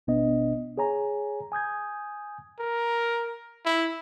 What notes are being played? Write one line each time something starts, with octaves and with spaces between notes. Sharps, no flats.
G#1 B2 B3 D4 D#5
G#4 C#5 G#5 A#5
G#5 D#6 G6 G#6
A#4
E4